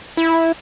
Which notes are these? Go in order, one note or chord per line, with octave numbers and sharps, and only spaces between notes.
E4